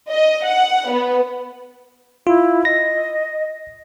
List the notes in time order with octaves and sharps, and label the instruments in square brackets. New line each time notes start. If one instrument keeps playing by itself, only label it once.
[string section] D#5
F#5
B3
[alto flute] E4 [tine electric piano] F4
[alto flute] D#5 [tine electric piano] A#6